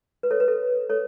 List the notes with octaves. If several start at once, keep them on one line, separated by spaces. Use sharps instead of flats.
B4
A4 C#5
B4
A4
A4 C#5